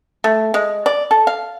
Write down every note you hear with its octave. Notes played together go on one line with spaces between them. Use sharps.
A3
G#3
D5
A4
F5